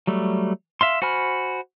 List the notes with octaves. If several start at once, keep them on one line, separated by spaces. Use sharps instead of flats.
F#3 G3 A3
E5 F5 C6
F#4 C5 G#5 B5 F6